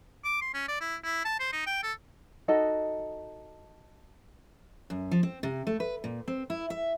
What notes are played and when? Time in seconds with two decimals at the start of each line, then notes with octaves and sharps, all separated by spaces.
0.25 D6
0.41 C6
0.54 C#4
0.68 D5
0.81 E4
1.04 E4
1.25 A5
1.40 C5
1.53 D#4
1.66 G5
1.83 A4
2.48 D#4 F#4 A4 D#5
4.90 F#2
5.11 F3
5.23 C4
5.43 C3
5.67 A3
5.80 B4
6.04 A#2
6.28 C4
6.50 E4
6.70 E5